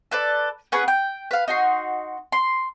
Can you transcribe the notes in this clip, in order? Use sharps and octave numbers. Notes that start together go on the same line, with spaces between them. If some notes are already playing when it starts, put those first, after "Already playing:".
A4 B4 D5
B3 C#4 G#4 B4
G5
B4 F5
D#4 F#4 C6
C6